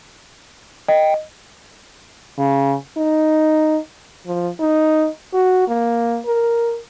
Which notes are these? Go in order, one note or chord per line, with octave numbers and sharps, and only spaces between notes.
D#5 G5
C#3
D#4
F3
D#4
F#4
A#3
A#4